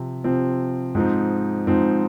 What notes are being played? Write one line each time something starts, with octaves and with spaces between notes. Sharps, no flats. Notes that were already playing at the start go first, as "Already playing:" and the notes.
Already playing: C3 F3 C4
C3 F3 C4
G#2 F3 C4 D#4
G#2 F3 C4 D#4